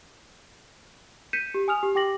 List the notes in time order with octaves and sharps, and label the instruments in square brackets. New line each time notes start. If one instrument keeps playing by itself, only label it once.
[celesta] G6 B6 C#7 D#7 E7
G4
G#5 D#6 F6 F7
G4
G4 G5 D6 A#6 F#7